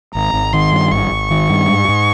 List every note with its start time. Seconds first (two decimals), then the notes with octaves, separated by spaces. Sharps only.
0.15 G#1 A#5
0.33 G#1
0.53 D#3 C6
0.72 G2
0.91 G#1 C#6
1.11 G#1
1.30 D#3
1.50 G2
1.69 G#2
1.89 G#2